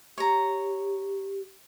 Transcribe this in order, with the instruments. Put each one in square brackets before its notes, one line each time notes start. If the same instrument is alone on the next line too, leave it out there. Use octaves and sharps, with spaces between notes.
[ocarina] G4 [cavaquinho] C#5 A#5